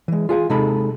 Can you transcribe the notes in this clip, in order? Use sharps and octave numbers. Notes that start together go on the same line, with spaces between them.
E3 G#3
F4 G#4 F5 G#5
C3 G#3 D#4 A4 B5